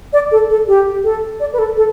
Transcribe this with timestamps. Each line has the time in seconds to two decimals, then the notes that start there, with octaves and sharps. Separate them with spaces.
0.13 D5
0.31 A4
0.50 A4
0.68 G4
1.04 A4
1.40 D5
1.53 B4
1.59 A4
1.77 A4